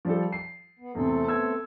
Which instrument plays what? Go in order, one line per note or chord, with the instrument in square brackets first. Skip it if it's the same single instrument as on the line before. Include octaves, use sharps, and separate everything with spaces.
[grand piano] F3 G3 A4
C7
[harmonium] B3
[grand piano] E2 C3 [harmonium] A3 C4 A4
[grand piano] B3 E6 G#6